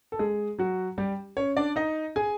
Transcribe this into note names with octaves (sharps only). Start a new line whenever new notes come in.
A4
G#3 G#4
F#3 F#4
G3 G4
C#4 C#5
D4 D5
D#4 D#5
G#4 G#5